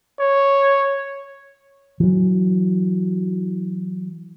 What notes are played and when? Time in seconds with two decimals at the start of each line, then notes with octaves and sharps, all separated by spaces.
0.20 C#5
2.00 E3 F#3